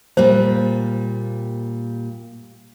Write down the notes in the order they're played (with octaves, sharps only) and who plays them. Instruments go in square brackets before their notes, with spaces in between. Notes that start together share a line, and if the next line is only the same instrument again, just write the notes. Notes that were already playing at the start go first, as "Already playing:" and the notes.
[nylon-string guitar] A#2 G3 A#3 [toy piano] C5